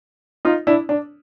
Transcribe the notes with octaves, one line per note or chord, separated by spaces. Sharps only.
D#4 F4
D4 E4
D4